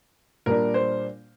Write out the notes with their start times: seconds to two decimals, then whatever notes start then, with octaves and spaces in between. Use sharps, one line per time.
0.46 A#2 G3 D4 A#4
0.74 C5